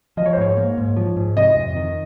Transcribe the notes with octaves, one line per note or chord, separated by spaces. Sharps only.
F3 D#5
C#5
C5
G#2 C#5
A#3
G#2
F3
G#2
C3 D#5
F2
D#3